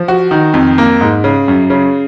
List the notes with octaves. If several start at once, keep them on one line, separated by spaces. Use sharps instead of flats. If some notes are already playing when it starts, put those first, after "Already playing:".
Already playing: F3
F#4
D#3
F2
A#3
G#2
C#3
F#2
C#3